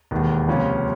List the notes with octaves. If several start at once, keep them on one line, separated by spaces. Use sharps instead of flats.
E1 D#2 D#3
C#2 C3 F3 A#3 C#4